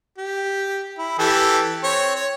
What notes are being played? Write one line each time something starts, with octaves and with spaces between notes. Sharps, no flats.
G4
E4
E3 G4 A4
C4 C#5
C#5